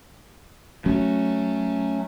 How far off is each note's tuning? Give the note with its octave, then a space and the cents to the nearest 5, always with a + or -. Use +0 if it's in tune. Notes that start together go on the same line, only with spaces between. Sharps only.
F#3 +0 A3 +0 C#4 +0